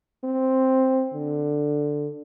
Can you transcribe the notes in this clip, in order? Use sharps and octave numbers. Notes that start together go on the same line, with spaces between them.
C4
D3